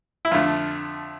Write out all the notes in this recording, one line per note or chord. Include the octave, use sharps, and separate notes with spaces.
E4
F2 D3 A3 F4